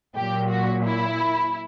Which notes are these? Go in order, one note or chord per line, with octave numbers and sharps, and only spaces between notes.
A#2 F#3 G4
F#4
E4